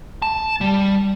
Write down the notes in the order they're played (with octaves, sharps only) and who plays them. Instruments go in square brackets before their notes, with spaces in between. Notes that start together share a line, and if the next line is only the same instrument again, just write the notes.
[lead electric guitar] A5
G3